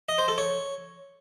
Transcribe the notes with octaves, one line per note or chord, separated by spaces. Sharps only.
D#5
C5
A4
C#5